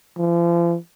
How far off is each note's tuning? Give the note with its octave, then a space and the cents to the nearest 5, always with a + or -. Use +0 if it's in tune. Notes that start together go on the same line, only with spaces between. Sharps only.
F3 -40